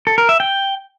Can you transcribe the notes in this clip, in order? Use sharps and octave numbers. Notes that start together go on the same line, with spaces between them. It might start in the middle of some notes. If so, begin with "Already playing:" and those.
A4
A#4
E5
G5